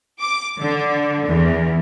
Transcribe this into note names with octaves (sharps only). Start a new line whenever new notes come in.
D6
D3
E2